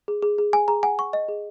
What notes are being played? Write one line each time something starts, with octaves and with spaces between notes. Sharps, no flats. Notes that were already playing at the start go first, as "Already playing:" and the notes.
G#4
G#4
G#4
G#4 G#5
G#4 A#5
F#5 G#5
F#5 C#6
D#5
G#4